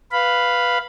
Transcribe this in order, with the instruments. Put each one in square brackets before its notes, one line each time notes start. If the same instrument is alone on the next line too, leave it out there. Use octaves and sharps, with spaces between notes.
[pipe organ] B4 F5 B5